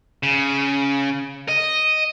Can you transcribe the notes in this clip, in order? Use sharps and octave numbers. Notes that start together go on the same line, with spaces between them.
C#3
D#5